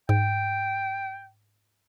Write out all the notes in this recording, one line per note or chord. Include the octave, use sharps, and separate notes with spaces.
G#2 G5